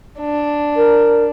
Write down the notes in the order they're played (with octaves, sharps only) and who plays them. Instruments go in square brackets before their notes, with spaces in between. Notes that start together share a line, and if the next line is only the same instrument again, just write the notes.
[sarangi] D4
[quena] A#4